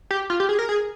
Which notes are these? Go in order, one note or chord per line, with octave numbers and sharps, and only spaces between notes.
G4
F4
G4
G#4
A#4
G#4